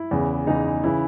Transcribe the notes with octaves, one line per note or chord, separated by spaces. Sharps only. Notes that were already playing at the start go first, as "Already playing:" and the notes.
Already playing: E4
E2 C#3 E3
E2 C#3 E3 D#4
C#3 E3 E4